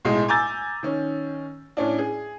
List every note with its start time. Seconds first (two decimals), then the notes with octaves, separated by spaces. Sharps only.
0.05 B1 A2 G#3
0.28 G#5 A#5 D6 E6 G6 A6
0.83 D#3 C#4
1.77 A2 C#4 D4
1.99 G#4